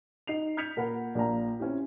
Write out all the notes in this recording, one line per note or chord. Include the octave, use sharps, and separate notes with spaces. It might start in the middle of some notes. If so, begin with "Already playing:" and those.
D#4 C7 F7
F6 G6 G#6 B6 C#7 F7
A#2 A#4 F#5 B5
A#1 A#3 D5 A#5
C4 C#4 E4 G4